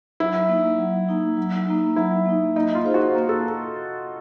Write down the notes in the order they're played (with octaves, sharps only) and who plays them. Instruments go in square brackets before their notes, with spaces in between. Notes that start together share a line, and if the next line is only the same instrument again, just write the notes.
[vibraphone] F#3 [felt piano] E4
[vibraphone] A#3 D#4
F#3
A#3 D#4
F#3
A#3 D#4
[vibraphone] F#3 [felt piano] E4
[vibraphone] A#3 D#4
[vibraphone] A#3 [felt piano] D#4
[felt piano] F4
[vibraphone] D#4 G#4 C5 F5
[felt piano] F#4
[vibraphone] A#3
[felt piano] A4